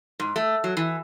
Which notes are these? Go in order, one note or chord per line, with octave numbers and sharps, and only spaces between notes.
G#2
A3
F#3
E3